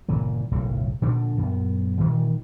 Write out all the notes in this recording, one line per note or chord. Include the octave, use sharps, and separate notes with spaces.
G1 A#2 C#3 E3
F#1 B1 A2 F#3
A#2 D3 F3 D4
A#1 F#2 B3
A#2 D#3 E3 G3